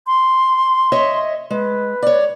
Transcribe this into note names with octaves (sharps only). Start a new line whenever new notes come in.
C6
C#5 D#5 E5
G#3 B4
C#5 D5